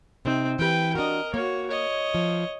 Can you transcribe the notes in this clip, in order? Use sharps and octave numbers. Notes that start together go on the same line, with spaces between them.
C3 C4 D#4
E3 G4 B4 G5
D4 F#4 A#4 D#5
A#3 F#4 C#5
C#5 D#5
F3